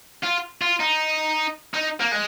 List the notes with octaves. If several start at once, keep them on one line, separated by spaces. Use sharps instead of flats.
F4
F4
D#4
D#4
A#3
G#3